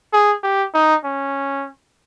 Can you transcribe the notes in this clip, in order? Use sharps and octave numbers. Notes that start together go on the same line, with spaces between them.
G#4
G4
D#4
C#4